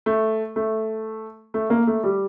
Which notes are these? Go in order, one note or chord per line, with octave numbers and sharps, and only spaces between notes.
A3
A3
A3
A#3
A3
G3